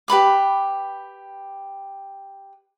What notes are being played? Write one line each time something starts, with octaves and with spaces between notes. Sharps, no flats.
G4 B4 B5 D6